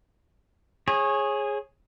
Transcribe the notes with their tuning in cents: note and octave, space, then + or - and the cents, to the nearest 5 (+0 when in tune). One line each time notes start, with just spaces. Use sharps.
G#4 +0 C#5 -25